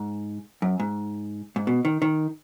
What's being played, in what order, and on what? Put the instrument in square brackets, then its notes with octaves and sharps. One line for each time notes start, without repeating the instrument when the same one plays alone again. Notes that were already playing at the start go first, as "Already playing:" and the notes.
Already playing: [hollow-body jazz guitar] G#2
F#2
G#2
G#2
B2
D#3
D#3